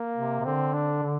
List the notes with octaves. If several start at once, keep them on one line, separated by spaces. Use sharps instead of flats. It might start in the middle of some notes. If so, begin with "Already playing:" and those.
Already playing: A#3
C3
C3
D3 C4
D4
D3